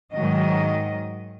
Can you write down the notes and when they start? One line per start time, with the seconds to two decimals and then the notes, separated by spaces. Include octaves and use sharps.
0.13 G#2 D#3 F#3 D#5